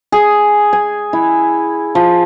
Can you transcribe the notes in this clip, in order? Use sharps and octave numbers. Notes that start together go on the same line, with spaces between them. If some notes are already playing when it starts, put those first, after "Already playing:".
G#4
G#5
E4
F3